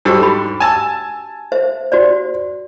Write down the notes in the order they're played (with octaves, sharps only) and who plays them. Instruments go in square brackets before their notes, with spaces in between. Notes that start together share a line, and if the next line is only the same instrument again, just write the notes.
[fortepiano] G#2 G3 A4 [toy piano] D4 F#4 G4
[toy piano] B5
[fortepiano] G#5 A5 E6
[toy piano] C5 E5
F#4 C5 D5